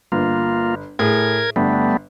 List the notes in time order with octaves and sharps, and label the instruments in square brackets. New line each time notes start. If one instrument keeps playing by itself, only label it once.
[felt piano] G1 [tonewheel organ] A#3 F4
[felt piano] A2 G#4 [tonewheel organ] A#4 G#6
[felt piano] G1 [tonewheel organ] G3 A3 B3